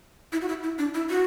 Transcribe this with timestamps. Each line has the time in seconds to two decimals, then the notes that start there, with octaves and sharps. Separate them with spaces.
0.32 E4
0.41 F#4
0.49 E4
0.63 E4
0.78 D4
0.94 E4
1.10 F#4